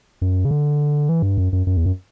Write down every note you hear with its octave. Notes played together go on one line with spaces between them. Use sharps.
F#2
C#3
D3
E3
G2
F#2
F#2
F#2
E2
F#2